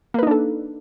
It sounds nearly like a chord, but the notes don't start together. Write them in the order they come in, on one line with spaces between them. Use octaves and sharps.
A#3 B4 D#4 D4 A4